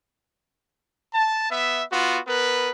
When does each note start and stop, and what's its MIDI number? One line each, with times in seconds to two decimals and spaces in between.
1.14 1.49 81
1.51 1.83 59
1.51 1.83 76
1.92 2.19 59
1.92 2.19 65
1.92 2.19 66
2.27 2.71 59
2.27 2.71 70
2.27 2.71 71